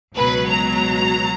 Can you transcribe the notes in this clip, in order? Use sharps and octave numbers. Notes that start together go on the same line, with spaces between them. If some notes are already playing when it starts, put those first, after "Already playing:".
C#2 B2 F#3 B4
A#5